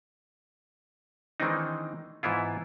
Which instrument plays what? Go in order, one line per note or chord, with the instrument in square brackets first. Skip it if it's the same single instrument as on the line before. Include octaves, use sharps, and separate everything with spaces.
[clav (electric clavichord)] D#3 E3 G#3 C4 D4 D#4
G#2 E3 B3 E4 F4